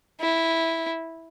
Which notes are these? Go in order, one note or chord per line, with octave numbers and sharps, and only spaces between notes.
E4